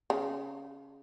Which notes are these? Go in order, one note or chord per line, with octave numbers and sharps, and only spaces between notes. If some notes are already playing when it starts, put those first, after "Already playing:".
C#3